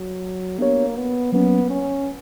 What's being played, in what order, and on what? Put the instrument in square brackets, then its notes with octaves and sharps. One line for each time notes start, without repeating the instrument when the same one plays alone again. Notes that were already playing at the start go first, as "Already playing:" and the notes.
Already playing: [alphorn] F#3
[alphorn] A#3 [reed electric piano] B3 D4 G4 C#5
[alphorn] B3
[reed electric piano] F#3 A#3 C#4 [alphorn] B3
[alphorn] C#4